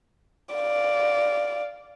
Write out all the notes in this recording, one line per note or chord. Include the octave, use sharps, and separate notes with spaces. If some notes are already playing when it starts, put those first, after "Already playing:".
D5 F5